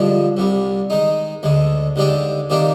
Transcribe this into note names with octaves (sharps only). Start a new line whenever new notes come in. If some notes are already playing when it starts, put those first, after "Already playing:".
Already playing: G2 D3 F3 G#3 D4
C2 C3 G3
D#3 G#3 D#4
D2 D3 G#3
D#2 D3 G#3 D4 G4
C3 D#3 A#3 D4 G4